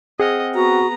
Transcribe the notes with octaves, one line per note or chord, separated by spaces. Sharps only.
C4 G#4 D#5 F#5 F6
B3 F#4 A#5